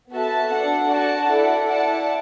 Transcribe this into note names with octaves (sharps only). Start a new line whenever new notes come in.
B3 F#4 A4 E5 A5
D4 A4 F#5
F#4 D5 F#5 A5
E4 A4 D5 F#5
E4 D5 F#5 A5